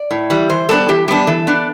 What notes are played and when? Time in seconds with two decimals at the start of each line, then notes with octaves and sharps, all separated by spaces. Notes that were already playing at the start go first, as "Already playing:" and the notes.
Already playing: D5
0.11 A2
0.30 E3 G3
0.49 E3 C5
0.69 G3 B3 D4 A4
0.88 E3 G4
1.08 G3 B3 D4 G4
1.27 E3 A4
1.47 B3 D4